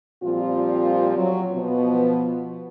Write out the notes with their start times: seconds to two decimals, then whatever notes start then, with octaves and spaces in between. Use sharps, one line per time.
0.23 A#2 F3 G3 C4 F4
1.16 F#3
1.54 B2 F3 B3